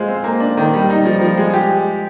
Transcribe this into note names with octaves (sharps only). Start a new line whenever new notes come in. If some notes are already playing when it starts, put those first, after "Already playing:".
Already playing: G#3 F4 C5
C4
A#3
D4
D#3
G3
D#4
F3
F3
G#3
G4